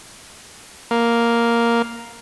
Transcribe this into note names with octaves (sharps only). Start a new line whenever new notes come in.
A#3